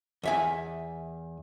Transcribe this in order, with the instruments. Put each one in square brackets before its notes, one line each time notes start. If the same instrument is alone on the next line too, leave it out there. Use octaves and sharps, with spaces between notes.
[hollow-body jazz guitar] E2 E5 G#5